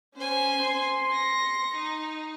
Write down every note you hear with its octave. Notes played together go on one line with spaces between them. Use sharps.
C#4 C5 G#5
C6
A#6 C#7
D#4